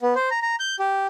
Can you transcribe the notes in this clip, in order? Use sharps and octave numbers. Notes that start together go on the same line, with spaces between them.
B3
C5
A#5
A#5
G6
G4